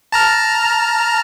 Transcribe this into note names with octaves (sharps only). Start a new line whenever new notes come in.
A5 A#5 F6